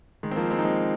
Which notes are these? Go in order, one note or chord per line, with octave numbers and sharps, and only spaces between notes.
D#3 G#3
C4
F3 A#3
G#3 C4
D#4
G#3 C4